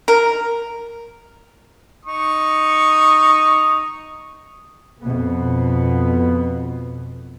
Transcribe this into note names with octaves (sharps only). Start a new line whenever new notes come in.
A#4
D#4 C#6 D#6
F2 B2 B3